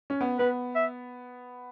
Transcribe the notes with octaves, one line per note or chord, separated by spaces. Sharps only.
C#4
B3
B3 B4
E5